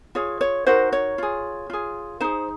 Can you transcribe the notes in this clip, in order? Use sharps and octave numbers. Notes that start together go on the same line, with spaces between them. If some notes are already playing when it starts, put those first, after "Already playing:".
F4 G#4 C#5
C#5
D#4 F#4 A#4 C5
C#5
F4 G#4
F4 G#4
D#4 G#4 C5